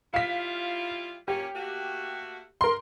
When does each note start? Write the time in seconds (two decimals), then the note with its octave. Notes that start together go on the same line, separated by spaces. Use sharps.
0.14 G3 E4 F4 F5 B6
1.28 A#2 A#3 C#4 G4
1.55 A3 A#3 F#4
2.61 A#4 C6